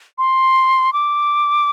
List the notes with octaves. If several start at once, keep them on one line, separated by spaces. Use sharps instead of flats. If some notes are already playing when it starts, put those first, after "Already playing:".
C6
D6